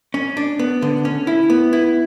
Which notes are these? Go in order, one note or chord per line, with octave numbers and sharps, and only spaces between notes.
C#4
D4
B3
D3
C#4
E4
B3
E4